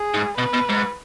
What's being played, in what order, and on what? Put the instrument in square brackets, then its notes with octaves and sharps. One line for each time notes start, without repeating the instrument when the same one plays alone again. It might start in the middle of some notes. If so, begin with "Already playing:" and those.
Already playing: [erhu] G#4
[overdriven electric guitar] G#2
[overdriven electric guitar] B2 [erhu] B4
[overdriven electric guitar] B2
G#2